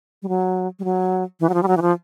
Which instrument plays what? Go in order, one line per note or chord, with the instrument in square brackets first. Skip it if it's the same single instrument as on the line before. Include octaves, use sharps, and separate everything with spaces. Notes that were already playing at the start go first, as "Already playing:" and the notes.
[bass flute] G3
F#3
G3
F#3
E3
F#3
F3
G3
F#3
E3
F3